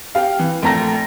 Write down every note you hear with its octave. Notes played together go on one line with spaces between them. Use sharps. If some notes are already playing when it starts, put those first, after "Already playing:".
G4 F5
E3
A#1 A3 A#5 A#6